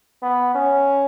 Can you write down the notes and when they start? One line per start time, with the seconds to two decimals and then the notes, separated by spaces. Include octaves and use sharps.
0.22 B3
0.54 C#4